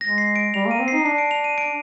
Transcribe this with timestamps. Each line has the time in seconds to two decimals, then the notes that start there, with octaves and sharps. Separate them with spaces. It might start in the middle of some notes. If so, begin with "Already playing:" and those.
0.01 G#3 A#6
0.18 C7
0.36 D7
0.54 G3 F7
0.67 A#3 D#7
0.79 C4
0.88 D#4 C7
1.05 D4 C7
1.18 D7
1.31 F7
1.44 D#7
1.58 D7